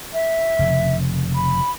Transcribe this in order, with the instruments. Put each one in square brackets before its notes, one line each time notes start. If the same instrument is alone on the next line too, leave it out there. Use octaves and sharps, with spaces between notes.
[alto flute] E5
[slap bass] F1 C#3
[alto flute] B5